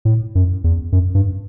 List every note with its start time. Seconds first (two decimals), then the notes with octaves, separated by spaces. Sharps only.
0.05 A2
0.35 F#2
0.64 E2
0.92 F#2
1.15 G2